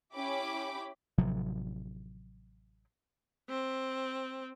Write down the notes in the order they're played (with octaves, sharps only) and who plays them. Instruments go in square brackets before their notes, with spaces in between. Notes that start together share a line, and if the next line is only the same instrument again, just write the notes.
[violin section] C#4 E4 G4 B5 D6
[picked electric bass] A1 C3 F3 F#3
[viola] C4